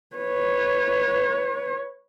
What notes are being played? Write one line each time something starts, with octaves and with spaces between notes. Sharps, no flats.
B4 C#5